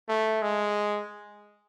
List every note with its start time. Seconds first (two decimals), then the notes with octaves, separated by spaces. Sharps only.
0.09 A3
0.42 G#3